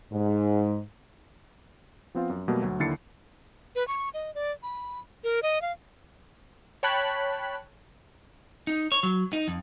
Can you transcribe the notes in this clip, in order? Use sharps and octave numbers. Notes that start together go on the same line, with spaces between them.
G#2
F3 B3 C4 F4 F5
F#2
B2 F#3 G3 A3 A#3
D2 F#3
D#2 D3 E4 A6 C7 C#7
B4
C#6
D#5
D5
B5
A#4
D#5
F5
C#5 G5 A5 B5 F#6 B6
D#4
C#5
F#3
D#4
F2